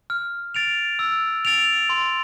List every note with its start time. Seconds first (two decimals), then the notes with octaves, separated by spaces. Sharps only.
0.10 F6
0.54 A6 D7 F7
0.99 E6
1.45 A6 D7 F7
1.90 C6